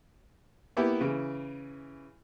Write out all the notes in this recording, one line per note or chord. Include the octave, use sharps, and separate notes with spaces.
A#3 B3 E4 G4
C#3 E3